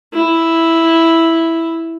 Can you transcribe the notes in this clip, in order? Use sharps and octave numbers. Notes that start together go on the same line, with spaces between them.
E4